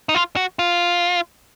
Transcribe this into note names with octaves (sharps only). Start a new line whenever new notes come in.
D#4
F4
F#4
F4